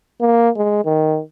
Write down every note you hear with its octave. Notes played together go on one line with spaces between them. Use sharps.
A#3
G#3
D#3